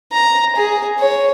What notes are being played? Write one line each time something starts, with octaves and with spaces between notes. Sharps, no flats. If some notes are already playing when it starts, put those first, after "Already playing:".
A#5
G#4
C#5